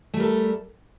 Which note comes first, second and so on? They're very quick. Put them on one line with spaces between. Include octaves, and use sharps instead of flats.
A3 G3 A#4 A4